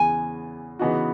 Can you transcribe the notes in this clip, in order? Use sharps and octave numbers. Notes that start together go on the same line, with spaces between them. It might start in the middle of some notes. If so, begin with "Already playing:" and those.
Already playing: E2 C#3 E3 B3 G#5
C#3 E3 B3 D#4 F#4